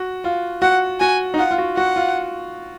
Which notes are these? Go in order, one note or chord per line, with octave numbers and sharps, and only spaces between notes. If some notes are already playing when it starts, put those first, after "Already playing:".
Already playing: F#4
F4
F#4 F#5
F#4 G#5
D#4
F4 F#5
F4
F#4
F#4 F#5
F4